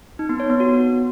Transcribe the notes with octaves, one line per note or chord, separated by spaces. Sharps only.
D#4
B3
C#5
B3
F#4